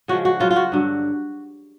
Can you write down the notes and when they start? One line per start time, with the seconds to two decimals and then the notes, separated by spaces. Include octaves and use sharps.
0.08 C#3 F3 G#3 F#4
0.25 F#4
0.40 C#3 F#3 F4
0.51 F4
0.56 F#4
0.72 G2 D3 F#3